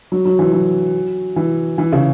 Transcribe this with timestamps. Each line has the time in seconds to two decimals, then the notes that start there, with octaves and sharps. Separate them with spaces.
0.12 F#3
0.25 F#3
0.39 E3
0.53 F#3
1.36 E3
1.78 E3
1.92 C#3